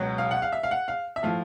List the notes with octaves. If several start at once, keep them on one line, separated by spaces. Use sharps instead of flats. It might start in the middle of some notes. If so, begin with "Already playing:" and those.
Already playing: C#2 B2 F#3
F5
F#5
F5
E5
F5
F#5
F5
E5
A2 F3 F5